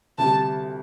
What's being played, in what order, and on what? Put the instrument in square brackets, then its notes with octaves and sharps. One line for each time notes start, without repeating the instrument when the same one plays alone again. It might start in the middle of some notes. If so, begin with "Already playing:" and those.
[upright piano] D2 C3 G3 [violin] A5